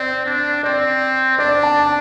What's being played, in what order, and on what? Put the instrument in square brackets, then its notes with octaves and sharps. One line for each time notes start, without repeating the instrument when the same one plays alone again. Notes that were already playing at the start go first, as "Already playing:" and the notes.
Already playing: [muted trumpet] C4 [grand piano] D5
[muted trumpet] D4
[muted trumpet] C4 [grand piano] D5
[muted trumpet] D4 [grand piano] D5
[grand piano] A5